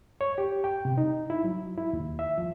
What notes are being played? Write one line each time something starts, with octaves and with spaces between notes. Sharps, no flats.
C#5
G4
G5
C3
D#4
E4
F#3
E4
D#2
E5
F3